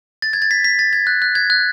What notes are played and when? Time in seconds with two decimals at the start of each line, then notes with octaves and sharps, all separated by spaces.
0.22 A6
0.33 G#6
0.42 A6
0.51 B6
0.64 B6
0.79 A6
0.93 G#6
1.07 F#6
1.22 F#6
1.35 G#6
1.50 F#6